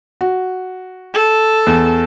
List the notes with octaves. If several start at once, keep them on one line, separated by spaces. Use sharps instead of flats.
F#4
A4
E2